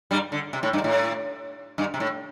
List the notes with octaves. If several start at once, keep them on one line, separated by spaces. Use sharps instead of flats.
G2 G3
D3
C3
A2
G2
A2
G2
C3
A2